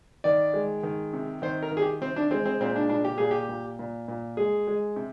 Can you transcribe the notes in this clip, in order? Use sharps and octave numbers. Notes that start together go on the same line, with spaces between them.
D#3 D5
G#3
D#3
C3
D#3 C5
A#4
D#3
G#4
G4
C3 C4
D4
G#3 C4
C4
A#2 C4
D4
A#2 D4
G4
A#2 G#4
G4
A#2
A#2
A#2
G#3 G#4
G#3
C3